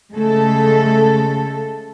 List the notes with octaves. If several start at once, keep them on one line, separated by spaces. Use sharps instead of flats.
C#3 G#3 A3 A4